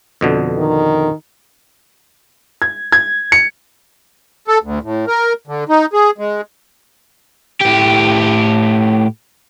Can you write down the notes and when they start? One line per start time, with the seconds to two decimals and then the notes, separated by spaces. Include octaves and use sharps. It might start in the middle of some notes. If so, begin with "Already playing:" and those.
0.21 F2 B2 D3
0.58 D#3
2.62 G#6
2.92 G#6
3.32 C#7
4.48 A4
4.63 D2
4.83 A2
5.07 A#4
5.48 D3
5.69 D#4
5.93 G#4
6.18 G#3
7.61 A2 G4